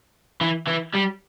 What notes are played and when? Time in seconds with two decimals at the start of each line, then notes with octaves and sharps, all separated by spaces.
0.41 E3
0.67 E3
0.94 G3